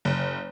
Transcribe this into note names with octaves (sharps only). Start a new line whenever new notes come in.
F#1